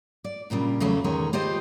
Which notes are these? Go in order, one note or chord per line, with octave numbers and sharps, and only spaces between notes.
D5
G2 A#2 C#3 G3
E2 C#3 F#3 A3 C#4
E2 D#3 G#3 C#5
F4 G4 G#4 C5 D#5